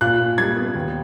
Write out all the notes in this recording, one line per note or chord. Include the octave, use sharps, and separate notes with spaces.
A#2 F#6
A#2
G3 G#6
B3
D#2